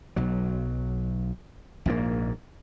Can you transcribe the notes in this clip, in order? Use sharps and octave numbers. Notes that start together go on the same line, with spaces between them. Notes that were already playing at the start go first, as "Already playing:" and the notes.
B1 F#3
A#1 G#2 C#3 A#3